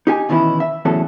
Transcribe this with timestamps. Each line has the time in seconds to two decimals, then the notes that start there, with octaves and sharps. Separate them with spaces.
0.07 D#4 G4 G#5
0.29 B2 D#3 E3 C#4 E4
0.60 E5
0.85 E2 A2 F#3 C#4 A4